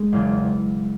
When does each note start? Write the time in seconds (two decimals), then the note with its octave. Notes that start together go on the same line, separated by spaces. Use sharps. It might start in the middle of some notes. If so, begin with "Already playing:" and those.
Already playing: G#3
0.12 F#1 E2 C#3